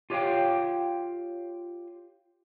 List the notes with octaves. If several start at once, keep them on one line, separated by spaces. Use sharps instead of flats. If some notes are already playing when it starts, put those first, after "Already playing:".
F4 G4 C#5 D#5 F5 G5